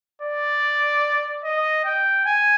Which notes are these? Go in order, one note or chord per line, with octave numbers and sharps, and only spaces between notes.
D5
D#5
G5
G#5